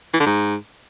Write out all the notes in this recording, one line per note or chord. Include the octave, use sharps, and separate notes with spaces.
E3
D3
G#2